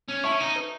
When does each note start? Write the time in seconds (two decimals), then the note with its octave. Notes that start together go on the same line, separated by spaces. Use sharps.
0.08 C#4
0.23 E4 E5 A5 C#6
0.32 C#4
0.40 D#4
0.56 B4